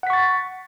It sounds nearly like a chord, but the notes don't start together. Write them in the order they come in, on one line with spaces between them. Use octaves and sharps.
F#5 B6 C#6 A6